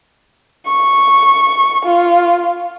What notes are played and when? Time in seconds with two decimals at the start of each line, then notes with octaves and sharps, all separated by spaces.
0.66 C#6
1.85 F4